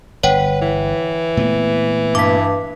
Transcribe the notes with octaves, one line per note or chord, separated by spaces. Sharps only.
G1 B4 C#5 F#5 G5
E3
A#2 A3 B3
G2 D6 B6